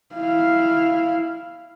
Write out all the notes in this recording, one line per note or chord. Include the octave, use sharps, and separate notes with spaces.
E4 F5